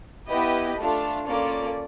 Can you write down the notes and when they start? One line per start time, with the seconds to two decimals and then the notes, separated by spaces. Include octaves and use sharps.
0.29 B3 E4 G4 B4 D#5
0.79 A3 D4 F4
1.27 A#3 C#4 F4 A4 D5